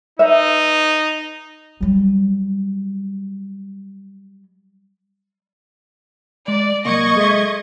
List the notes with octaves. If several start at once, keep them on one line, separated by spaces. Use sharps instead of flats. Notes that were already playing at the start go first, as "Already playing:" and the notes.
D#4 B4 E5
F#3 G3
G#3 D5
C2 F#3 A#3 D#5 C#6 G#6
G#3 A4 E5